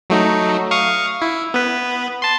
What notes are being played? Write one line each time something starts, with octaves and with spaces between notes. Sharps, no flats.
F#3 A3 D#4
F5 C#6 D#6
E4
B3 B4
A5 C6